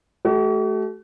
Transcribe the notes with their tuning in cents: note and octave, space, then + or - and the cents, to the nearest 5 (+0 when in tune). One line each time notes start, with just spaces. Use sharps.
A3 -30 F#4 +45